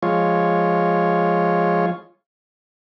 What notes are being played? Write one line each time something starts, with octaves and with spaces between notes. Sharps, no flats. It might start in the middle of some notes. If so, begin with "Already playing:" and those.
F3 G#3 F4 C#5